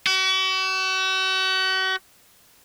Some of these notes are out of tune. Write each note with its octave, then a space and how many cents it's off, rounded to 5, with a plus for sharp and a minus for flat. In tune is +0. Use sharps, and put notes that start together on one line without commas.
F#4 +40